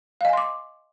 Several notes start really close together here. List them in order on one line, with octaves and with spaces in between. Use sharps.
F5 D#5 G#5 C6 D6